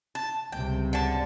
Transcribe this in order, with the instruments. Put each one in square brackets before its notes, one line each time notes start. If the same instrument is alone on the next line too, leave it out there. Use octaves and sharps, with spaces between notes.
[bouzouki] A5
[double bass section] C#2 G2 C3 [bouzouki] G5
[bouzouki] D3 A5